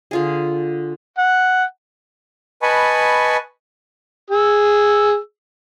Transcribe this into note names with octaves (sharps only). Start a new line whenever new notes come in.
D3 F4 G#4
F#5
B4 D#5 G#5 A5 B5 C#6
G#4 E6